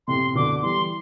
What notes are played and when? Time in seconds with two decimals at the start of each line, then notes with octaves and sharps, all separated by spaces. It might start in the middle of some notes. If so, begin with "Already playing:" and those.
0.07 A2 C3 C6
0.35 B2 D3 D6
0.62 E3 G3 C6